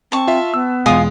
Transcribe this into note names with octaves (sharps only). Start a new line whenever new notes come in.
C4 A5 C#6
F4 E5
B3 E6
E2 B2 G#3 F4 G#5 D#6